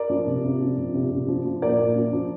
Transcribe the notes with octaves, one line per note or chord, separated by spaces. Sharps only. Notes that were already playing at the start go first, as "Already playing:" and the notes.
Already playing: A#4 D5
F3
C3
C3
F3
F3
C3
C3
F3
F3
A#2 A#4 D5
A#2
F3
F3